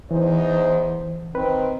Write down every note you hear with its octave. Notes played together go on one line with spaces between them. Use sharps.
E2 E3 D#4 C5
D#3 C4 B4